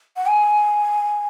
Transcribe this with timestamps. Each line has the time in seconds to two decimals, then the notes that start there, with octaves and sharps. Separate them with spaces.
0.17 F#5
0.27 G#5